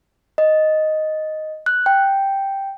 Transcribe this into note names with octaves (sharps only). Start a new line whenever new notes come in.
D#5
F#6
G5